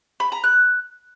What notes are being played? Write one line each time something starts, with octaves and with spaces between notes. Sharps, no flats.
B5
A#5
F#6